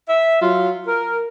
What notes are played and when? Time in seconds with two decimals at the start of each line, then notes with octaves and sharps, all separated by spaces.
0.09 E5
0.41 F#3 F4
0.88 A#4